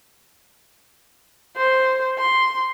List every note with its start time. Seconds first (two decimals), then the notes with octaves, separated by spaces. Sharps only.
1.57 C5
2.18 C6